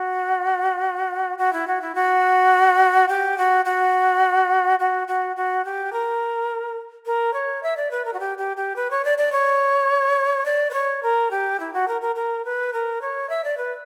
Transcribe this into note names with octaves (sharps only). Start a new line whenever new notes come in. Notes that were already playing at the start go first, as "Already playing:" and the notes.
Already playing: F#4
F#4
E4
F#4
E4
F#4
G4
F#4
F#4
F#4
F#4
F#4
G4
A#4
A#4
C#5
E5
D5
B4
A#4
F#4
G4
G4
G4
B4
C#5
D5
D5
C#5
D5
B4
C#5
A#4
G4
E4
F#4
A#4
A#4
A#4
B4
A#4
C#5
E5
D5
B4